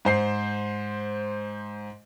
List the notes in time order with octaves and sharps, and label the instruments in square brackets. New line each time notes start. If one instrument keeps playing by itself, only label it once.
[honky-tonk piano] G#2 C5 C7